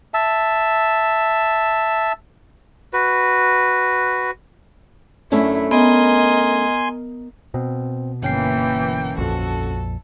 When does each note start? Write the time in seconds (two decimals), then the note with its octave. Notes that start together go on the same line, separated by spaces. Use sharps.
0.14 E5 A5
2.93 F#4 B4
5.32 F#2 A3 C#4 D4 E4
5.71 B3 A#4 D#5 G#5 C6
7.54 B2 C4
8.22 G1 E3 A#3 C#4 G5 C7
9.18 A#1 F2 F#4 A4